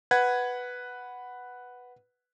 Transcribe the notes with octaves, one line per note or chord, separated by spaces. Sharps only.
B4 F#5 G#6